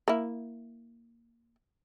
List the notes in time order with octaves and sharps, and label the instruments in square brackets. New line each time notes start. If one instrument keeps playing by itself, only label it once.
[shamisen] A#3 E4